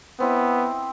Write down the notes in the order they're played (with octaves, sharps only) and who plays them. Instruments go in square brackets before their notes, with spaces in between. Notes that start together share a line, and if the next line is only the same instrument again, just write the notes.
[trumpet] B3 [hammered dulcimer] C4 E4 D#5